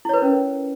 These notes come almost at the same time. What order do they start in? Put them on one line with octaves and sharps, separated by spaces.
E4 C#5 B4 A#4 C#4